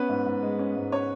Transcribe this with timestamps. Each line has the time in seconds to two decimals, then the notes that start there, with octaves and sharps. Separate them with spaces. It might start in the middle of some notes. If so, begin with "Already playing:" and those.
Already playing: B3 C#4 B4
0.09 G#2
0.26 G#2
0.43 G#3
0.59 C#4
0.76 G#2
0.92 C#4 C#5